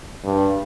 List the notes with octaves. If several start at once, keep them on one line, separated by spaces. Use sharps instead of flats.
G2